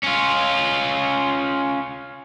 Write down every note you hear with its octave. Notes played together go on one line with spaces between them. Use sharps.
C#4 F4